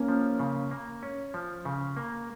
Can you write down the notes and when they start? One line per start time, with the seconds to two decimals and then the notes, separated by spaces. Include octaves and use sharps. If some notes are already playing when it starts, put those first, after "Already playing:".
Already playing: A#3 C#4
0.09 F3
0.39 C#3
0.71 A#3
1.03 C#4
1.34 F3
1.65 C#3
1.97 A#3